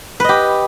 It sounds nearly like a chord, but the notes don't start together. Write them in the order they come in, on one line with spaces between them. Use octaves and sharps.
B4 D#5 G4